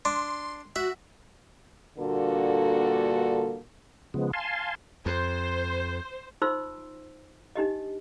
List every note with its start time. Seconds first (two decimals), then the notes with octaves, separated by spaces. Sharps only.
0.05 D4 C6
0.76 F#4 E5
1.98 G2 A#2 D3 A#3 F#4 A4
4.14 C#3 F3 G#3 B3
4.33 F5 G#5 A5 C6
5.06 F2 C5
6.42 D#4 F4 C5 C6 E6
7.56 D4 D#4 G4 D#5